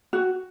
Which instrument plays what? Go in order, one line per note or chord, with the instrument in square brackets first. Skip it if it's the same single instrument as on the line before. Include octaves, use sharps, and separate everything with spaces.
[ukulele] F#4